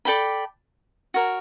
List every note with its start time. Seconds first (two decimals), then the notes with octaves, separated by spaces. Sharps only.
0.05 A4 D5 G5 B5
1.14 F#4 A#4 C#5